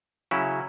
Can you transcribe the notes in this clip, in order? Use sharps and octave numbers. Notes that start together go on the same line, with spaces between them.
C#3 F#3 C#4 E4